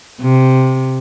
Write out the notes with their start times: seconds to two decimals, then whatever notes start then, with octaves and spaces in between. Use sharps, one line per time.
0.21 C3